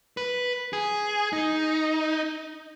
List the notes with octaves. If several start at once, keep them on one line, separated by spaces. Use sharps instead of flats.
B4
G#4
D#4